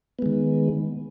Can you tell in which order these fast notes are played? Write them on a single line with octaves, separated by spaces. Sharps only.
B3 G#3 D#3